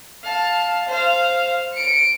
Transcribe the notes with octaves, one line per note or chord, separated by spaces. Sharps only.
F5 A5
C5 F5
C#7 D7